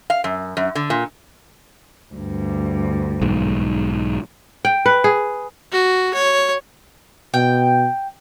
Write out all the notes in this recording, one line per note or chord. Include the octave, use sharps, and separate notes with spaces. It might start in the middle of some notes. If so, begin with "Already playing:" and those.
F5
F#2
F#2
D3
A#2
D2 G2
B1 G#2
G5
B4
G#4
F#4
C#5
B2 G5